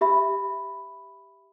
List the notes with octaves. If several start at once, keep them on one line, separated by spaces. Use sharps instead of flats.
G4 E5 B5